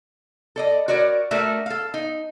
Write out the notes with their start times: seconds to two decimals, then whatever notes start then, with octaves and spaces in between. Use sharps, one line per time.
0.56 A4 D5 D#5
0.88 F#4 A#4 C#5 D5
1.31 A3 D4 F#4 A4 A#4 E5
1.66 A4 F5
1.94 D#4